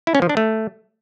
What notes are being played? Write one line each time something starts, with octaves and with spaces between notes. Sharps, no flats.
E4
C#4
F3
D4
A3